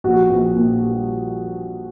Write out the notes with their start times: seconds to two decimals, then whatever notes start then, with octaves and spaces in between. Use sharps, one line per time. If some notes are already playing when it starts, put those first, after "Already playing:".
0.04 A#1 F#4
0.30 A#1
0.55 A#2
0.81 G3